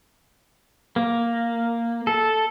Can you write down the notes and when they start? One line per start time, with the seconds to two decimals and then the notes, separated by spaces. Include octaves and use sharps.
0.96 A#3
2.07 A4